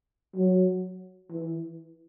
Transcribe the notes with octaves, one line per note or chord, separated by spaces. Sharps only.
F#3
E3